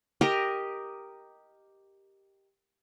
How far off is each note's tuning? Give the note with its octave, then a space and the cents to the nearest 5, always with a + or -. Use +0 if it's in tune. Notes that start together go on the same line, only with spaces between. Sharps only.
G4 +0 A#4 +0 D#5 +0